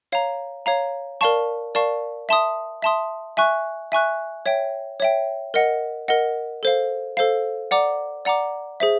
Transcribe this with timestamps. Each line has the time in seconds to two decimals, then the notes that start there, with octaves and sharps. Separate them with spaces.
0.12 C#5 F5 A#5
0.66 C#5 F5 A#5
1.21 A#4 D5 F5 A5 C#6
1.75 A#4 D5 F5 A5 C#6
2.29 E5 A5 C6 D#6
2.82 E5 A5 C6 D#6
3.37 E5 G#5 C#6 F#6
3.92 E5 G#5 C#6 F#6
4.46 C#5 E5 G5
5.00 C#5 E5 G5
5.54 A#4 D#5 F#5
6.08 A#4 D#5 F#5
6.63 A4 C5 F5
7.17 A4 C5 F5
7.71 D5 F#5 A#5 D6
8.25 D5 F#5 A#5 D6
8.80 G#4 C5 E5